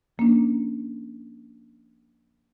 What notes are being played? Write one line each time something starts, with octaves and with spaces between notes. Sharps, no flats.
F3 A#3 C#4 D4